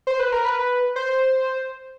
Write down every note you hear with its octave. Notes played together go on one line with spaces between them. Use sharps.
C5
B4
A#4
B4
C5